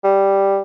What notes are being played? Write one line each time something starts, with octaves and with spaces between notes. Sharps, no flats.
G3